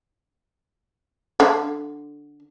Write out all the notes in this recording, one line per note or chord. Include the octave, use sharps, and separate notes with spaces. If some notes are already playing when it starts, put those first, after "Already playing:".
D3